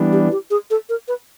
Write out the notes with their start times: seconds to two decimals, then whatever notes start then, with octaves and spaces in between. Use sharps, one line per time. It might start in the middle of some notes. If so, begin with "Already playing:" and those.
Already playing: E3 G3 B3 D4
0.12 G4
0.32 G4
0.50 G#4
0.70 A4
0.89 A#4
1.08 B4